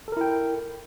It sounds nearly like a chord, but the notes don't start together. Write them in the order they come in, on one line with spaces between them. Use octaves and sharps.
A4 A#4 E4 G5